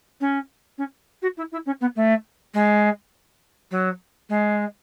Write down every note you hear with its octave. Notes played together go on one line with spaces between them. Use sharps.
C#4
C#4
F#4
E4
E4
C#4
B3
A3
G#3
F#3
G#3